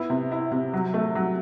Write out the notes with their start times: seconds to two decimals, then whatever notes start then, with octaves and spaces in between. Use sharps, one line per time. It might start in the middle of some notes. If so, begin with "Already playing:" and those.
Already playing: B3 E4
0.10 C3
0.32 E4
0.52 C3
0.73 F#3
0.94 A3
1.15 F#3